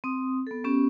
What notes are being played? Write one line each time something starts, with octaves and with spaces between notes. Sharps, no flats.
C4 D#6
B3 A4
B3 C#4 G4